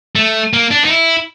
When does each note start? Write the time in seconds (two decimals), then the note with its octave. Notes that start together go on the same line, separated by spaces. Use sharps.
0.16 A3
0.53 A#3
0.71 D4
0.85 D#4
0.89 E4